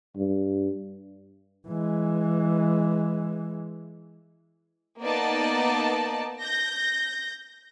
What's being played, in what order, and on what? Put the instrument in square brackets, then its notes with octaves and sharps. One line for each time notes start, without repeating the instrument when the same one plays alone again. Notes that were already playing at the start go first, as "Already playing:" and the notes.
[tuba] G2
[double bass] E3 G#3
[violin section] A#3 B3 D#4 D5 A5
G6 A#6